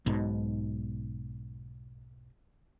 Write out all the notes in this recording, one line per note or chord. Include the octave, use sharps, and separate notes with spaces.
B1 G#2 B2